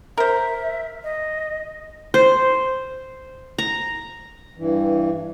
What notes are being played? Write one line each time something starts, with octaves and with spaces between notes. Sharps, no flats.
A#4 C5 E5
D#5
C5
A#5
G2 E3